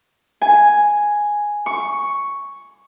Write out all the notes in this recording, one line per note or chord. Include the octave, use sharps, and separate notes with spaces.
G#5
C#6